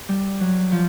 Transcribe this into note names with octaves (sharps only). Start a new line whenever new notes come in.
G3
F#3
F3